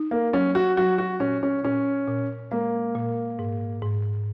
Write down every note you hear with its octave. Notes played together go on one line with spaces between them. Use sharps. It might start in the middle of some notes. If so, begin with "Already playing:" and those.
Already playing: D#4
A#3
F#3 C#4
F#4
F#3 F#4
F#4
A#2 C#4
C#4
A#2 C#4
A#2
G#3 A#3
A#2
G#2
G#2